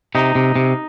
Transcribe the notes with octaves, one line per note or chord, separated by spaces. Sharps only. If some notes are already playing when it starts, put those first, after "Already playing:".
C3 D#4
C3
C3